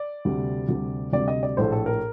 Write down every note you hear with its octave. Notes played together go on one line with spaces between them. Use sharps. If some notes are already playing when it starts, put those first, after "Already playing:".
Already playing: D5
D2 C3 G3
D2 C3 G3
D2 C3 G3 D5
D#5
D5
A#1 A2 A3 C5
A4
A#4